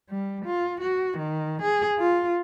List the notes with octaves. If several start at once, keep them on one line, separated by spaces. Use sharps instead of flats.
G3
F4
F#4
D#3
G#4
F4